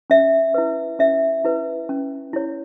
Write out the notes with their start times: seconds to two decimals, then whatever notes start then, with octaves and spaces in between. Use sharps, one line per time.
0.10 C#4 E5
0.54 E4 B4
0.99 C#4 E5
1.45 E4 B4
1.89 C#4
2.33 E4 C#5